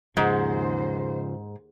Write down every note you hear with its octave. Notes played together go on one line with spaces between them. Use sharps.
D#2 G#2 C#3 F3 G#4 C5 F#5